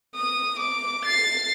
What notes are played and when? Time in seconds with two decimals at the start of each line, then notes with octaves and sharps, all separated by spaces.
0.16 D#6
0.60 D6
1.06 A6 C7